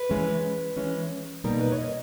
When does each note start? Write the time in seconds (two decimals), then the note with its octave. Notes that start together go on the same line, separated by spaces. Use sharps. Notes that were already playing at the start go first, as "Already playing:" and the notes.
Already playing: B4
0.10 E3 G#3 C#4
0.77 E3 G#3 C#4
1.44 B2 G3 A#3 D#4 A#4
1.60 B4
1.72 C#5
1.78 D#5